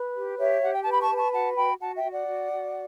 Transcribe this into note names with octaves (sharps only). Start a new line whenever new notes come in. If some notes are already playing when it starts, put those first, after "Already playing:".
Already playing: B4
G4
G4 C#5 E5
G4 F#5
G5
B4 A5
B5
A5 C#6
B4
A5 C#6
F#4 F#5 A5
F#4 G5 B5
F#4 F#5 A5
E5 G5
F#4
D5 F#5
F#4
F#4